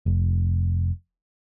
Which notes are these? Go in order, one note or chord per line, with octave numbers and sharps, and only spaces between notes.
F1